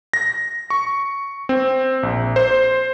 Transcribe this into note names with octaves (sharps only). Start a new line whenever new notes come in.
A#6
C#6
C4
A#1
C5